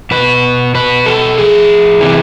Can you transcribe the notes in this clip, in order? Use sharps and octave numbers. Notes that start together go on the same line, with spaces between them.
B2 B4
B2 B4
A4
A2 F3 G#4
C3 E3